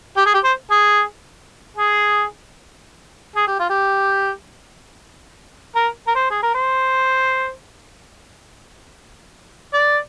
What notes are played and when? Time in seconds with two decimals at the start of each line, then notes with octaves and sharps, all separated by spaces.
0.17 G4
0.26 G#4
0.34 G4
0.44 C5
0.71 G#4
1.77 G#4
3.36 G#4
3.48 G4
3.59 F4
3.70 G4
5.76 A#4
6.07 A#4
6.15 C5
6.31 G#4
6.43 A#4
6.54 C5
9.74 D5